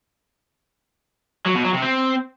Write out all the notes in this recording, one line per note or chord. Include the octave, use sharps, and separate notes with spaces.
F#3
B2
F#3
C3
C4